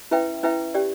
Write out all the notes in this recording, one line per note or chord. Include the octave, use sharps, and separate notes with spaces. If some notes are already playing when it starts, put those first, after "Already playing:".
C#4 E4 B4 E5 G5
C#4 E4 B4 E5 G5
C#4 G4 D5